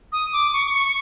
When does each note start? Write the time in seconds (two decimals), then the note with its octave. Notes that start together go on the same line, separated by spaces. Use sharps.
0.12 D#6
0.33 D6
0.53 C#6
0.73 C#6